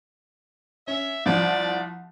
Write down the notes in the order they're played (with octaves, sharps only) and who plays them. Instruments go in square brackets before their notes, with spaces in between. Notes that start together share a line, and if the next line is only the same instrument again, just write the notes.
[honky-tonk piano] C#4 [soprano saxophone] E5
[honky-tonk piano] C2 F3 [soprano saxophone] D5